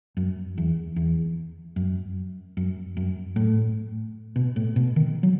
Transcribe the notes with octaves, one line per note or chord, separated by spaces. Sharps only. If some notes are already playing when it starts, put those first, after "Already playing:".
F#2
E2
E2
F#2
F#2
F#2
A2
B2
A2
B2
D#3
F#3